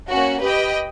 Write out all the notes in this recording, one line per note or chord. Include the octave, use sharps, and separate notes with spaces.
A#3 C#4 F#4
G4 B4 D#5 G5